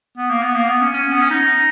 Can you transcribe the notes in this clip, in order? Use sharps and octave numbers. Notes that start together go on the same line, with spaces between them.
B3
A#3
B3
A#3
B3
C#4
C#4
B3
C#4
D#4